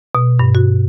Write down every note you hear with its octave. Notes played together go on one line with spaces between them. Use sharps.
B2
G2
F#4